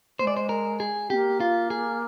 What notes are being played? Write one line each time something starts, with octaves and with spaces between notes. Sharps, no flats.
A#3 C5
G#3 D5
C5
A#4
G#4
A#3 C4 G4
F4
G#4